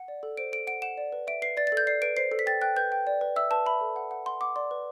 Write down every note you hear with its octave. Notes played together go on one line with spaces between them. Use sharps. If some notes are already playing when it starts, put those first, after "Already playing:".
Already playing: F#5
D5
A4
C5 D7
A4 D7
F#5 D7
F#5 E7
D5
B4
E5 D7
B4 C7
D5 A6
A6
A4 G6
D5 C7
B4 D7
C5 C7
A4
B6
G5 A6
G5 F#6
B4 G6
G5
D5
B4
E5 E6
B4 A5
E5 B5
A4
F#5
F#5
F#5 C6
F#5 D6
D5 C6
B4